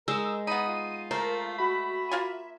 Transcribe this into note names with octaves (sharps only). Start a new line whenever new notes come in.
G#3 D#4 A#4 E6
B3 D#4 B5 D#7
F4
A3 A#4 C5
F#4 E5 B5
A#3 F4 G#5